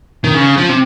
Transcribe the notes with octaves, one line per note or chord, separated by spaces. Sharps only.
D#3
C#3
F3
C3